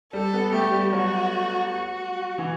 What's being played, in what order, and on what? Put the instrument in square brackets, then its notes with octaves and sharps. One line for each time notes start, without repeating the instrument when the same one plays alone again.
[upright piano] G3 [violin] A4
[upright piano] B3
[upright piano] A3 [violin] G4
[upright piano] G3
[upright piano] F#3 [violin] F#4
[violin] F#4
[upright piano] E3